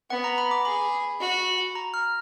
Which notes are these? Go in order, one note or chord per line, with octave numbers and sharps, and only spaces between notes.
B3 F#5
A#5
B5
D6
G#4 B5
F#4
A#5
F6